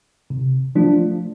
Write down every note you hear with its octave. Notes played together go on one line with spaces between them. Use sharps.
C3
F3 A3 D4 F4